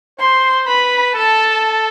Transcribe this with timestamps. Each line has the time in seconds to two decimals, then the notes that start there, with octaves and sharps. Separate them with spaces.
0.20 C5 C6
0.67 B4 B5
1.15 A4 A5